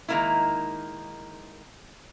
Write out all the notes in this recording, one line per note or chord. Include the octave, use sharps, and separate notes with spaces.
D#3 G#3 A#3 D#4 E4